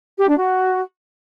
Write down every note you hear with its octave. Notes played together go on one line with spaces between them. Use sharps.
G4
D4
F#4